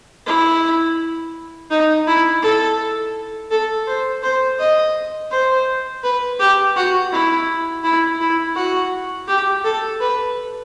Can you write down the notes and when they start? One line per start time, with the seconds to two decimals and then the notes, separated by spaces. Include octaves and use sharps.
0.26 E4
1.70 D#4
2.07 E4
2.42 A4
3.51 A4
3.87 C5
4.23 C5
4.59 D#5
5.31 C5
6.03 B4
6.40 G4
6.76 F#4
7.12 E4
7.84 E4
8.20 E4
8.56 F#4
9.28 G4
9.64 A4
10.00 B4